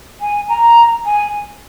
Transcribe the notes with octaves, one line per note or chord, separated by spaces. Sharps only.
G#5
A#5
G#5